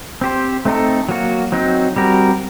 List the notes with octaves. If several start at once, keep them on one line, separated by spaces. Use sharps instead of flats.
C4 G4 C5
A3 C4 D#4 A4
F#3 A#3 F#4
F#3 C4 D#4
G3 C4 F#4 A#4